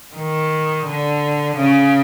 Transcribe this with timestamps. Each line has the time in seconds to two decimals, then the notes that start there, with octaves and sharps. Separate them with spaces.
0.16 D#3
0.86 D3
1.56 C#3